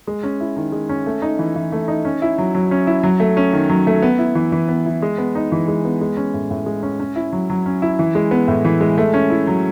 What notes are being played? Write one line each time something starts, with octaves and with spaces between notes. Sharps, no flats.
G#3
C#4
E4
D#3
G#3
C#4
A3
D#4
E3
E3
A3
D#4
C#4
E4
F#3
F#3
C#4
E4
F#3
A3
C#4
D#3
F#3
A3
B3
E4
E3
E3
B3
E4
G#3
B3
D#4
E3
G#3
B3
G#3
C#4
A2
A2
G#3
C#4
C#4
E4
F#3
F#3
C#4
E4
E3
G#3
B3
A2
E3
G#3
A3
C#4
E4
F#3